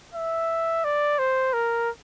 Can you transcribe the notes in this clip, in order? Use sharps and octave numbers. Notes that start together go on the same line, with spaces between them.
E5
D5
C5
A#4